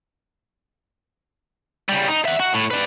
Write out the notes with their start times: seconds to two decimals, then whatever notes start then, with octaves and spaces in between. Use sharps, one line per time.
1.89 C#3 G3
2.08 D#4
2.25 E5 F#5
2.40 F#4
2.54 A2
2.71 B4 D5